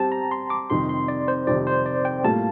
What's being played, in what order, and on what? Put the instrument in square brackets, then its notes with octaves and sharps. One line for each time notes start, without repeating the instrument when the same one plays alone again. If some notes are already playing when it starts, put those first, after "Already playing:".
Already playing: [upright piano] G3 C4 G4 [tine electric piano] G5 A5
[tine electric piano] A#5
C6
D6
[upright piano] F2 C3 D#3 G3 [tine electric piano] C6
[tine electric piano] C6
D5
C5
[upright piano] F2 C3 D#3 G3 [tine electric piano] D5
[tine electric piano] C5
D5
G5
[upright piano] A2 G3 A#3 F4 [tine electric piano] A5